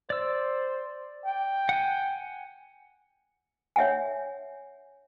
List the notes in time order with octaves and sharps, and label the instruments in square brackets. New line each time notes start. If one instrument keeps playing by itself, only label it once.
[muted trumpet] C5 [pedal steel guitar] D5 E6
[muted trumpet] G5
[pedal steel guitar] F#5 G#5
[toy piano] C#5 E5 F#5 G#5